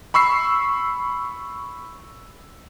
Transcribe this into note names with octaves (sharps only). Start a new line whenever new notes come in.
B5 C#6 E6 C7